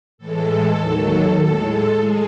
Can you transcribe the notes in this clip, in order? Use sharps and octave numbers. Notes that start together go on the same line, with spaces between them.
A2 E3 G#3 A4
D#2 D#3 F#3
A2 G#3 A4
A4
G#3 G#4